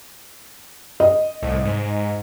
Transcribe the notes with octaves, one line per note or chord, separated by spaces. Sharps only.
D#5
C2 A2
G#2